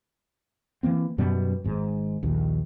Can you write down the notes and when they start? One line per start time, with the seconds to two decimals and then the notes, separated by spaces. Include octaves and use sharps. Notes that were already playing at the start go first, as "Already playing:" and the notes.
0.83 E3 F#3 A#3 C4
1.18 F#2 B2 G3 B3
1.64 G#1 G#2 G#3
2.23 A#1 D#2